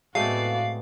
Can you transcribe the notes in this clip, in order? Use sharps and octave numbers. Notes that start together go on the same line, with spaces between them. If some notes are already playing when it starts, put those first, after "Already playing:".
A2 G#3 A3 B3 C4 F#4 D5 F5